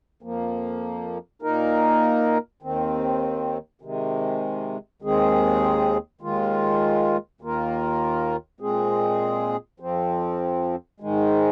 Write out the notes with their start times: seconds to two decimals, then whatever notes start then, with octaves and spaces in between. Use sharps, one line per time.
0.22 F2 F3 A#3
1.42 A#2 A#3 D#4 A#4
2.62 D#2 D#3 C4
3.81 C3 D#3 G#3
5.02 D#2 D#3 G#3 C4 G#4
6.21 D#2 D#3 G#3 F4
7.41 D#2 D#3 A#3 F4 A#4
8.60 A#2 G#3 C4 G#4
9.80 F2 F3 C4
11.00 G#2 D#3 G#3